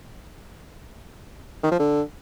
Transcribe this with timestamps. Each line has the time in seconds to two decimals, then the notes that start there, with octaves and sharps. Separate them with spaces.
1.63 D#3
1.71 F3
1.79 D3